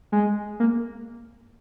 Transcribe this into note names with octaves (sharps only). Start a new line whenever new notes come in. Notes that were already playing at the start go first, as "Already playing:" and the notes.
G#3
A#3